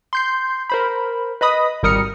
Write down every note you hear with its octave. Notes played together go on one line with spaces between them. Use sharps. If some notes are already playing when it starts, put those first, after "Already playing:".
C6 G6 C7
A#4 C5 B5
B4 D#5 B5 D#6
G#1 G3 A#4 D#6 F6 C#7